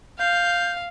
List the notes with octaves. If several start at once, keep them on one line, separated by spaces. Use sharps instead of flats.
F5 G6